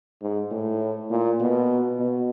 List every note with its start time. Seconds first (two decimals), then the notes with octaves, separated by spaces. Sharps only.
0.22 G#2
0.51 A2
1.10 A#2
1.40 B2
1.99 B2